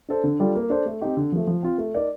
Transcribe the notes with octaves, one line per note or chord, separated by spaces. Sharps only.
D4 A4 C5
D3
G3 D4 F4 A4
A#3
D4 A4 C5
A3
C4 D#4 G4
D3
F3 A3
F3
C4 F4
A3
D#4 A#4 D5